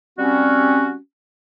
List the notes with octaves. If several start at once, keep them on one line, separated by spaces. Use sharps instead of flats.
G3 C4 C#4 F#4